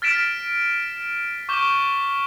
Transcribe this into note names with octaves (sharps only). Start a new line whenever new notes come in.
F6 A6 B6 D7 E7
C#6 D6 G6 E7 G7